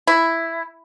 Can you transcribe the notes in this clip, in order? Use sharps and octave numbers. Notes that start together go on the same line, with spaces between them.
E4